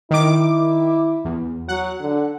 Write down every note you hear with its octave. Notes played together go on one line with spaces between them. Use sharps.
D#3 E4 D6
E2
F#3 F#5
D3